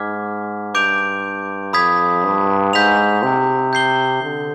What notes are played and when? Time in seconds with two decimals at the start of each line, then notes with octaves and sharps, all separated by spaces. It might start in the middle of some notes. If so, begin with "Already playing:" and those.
Already playing: G#2 D6 F6 G#6 B6
0.74 G2 D6 G6 D7 F7
1.73 F2 B5 D#6 G#6 B6
2.24 G2
2.73 G#2 G6 B6 F7
3.23 C3
3.73 G6 C7 G7
4.23 D3